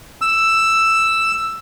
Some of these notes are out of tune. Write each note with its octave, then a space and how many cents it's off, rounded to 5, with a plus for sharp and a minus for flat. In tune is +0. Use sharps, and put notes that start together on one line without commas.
E6 +5